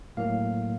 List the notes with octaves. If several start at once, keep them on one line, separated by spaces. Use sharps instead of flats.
A2 F#3 A#3 F5